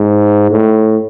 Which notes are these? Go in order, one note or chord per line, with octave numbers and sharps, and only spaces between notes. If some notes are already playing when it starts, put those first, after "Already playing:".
Already playing: G#2
A2